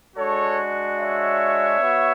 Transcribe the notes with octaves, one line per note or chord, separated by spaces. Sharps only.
G#3 D4 F#4 A4 C#5
C#5 E5
B3 F#4